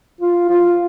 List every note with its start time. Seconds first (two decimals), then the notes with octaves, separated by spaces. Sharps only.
0.21 F4
0.49 F4